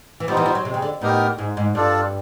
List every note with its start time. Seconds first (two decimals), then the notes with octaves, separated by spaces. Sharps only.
0.20 E3
0.28 F3 G3 B3 D#4
0.37 E3
0.46 F3
0.55 F#3
0.65 C3
0.74 C#3
0.82 D3
1.01 A2 B3 D#4 G4 A#4
1.38 G#2
1.57 G#2
1.75 G2 D4 F4 A4 D5